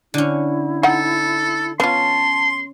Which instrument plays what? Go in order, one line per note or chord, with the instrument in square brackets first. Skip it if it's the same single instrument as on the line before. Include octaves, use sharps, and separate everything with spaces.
[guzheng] D3 C#4 [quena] E4
[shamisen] D#4 F#5 [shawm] A4
[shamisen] B3 F4 [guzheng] C#4 [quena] A5 [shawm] C6